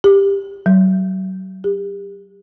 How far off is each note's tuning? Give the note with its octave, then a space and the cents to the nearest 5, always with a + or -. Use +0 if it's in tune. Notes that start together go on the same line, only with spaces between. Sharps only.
G4 +15
F#3 +35
G4 +30